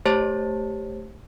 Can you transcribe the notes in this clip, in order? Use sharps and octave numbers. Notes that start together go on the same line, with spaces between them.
A3 G4 C5 C#5 A5 A6